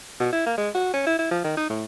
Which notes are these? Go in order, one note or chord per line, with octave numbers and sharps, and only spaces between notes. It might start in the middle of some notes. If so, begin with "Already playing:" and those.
B2
E4
A#3
G#3
F#4
C#4
E4
E4
F3
D#3
D#4
A2